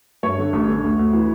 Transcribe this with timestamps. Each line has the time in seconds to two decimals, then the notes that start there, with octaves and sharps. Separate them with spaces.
0.23 G2 C#5
0.38 D3
0.53 A1
0.68 D3
0.84 D2
0.99 D2
1.13 E3